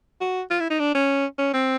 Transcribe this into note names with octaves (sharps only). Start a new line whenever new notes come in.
F#4
F4
E4
D#4
D4
C#4
C#4
C4